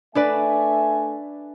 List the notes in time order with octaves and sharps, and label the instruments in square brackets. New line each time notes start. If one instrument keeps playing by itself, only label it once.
[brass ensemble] A3 E5 G#5 [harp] D4 B4 D5